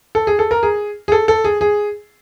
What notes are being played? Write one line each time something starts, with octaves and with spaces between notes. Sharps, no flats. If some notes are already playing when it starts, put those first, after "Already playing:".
A4
G#4
A4
A#4
G#4
G#4
A4
A4
G#4
G#4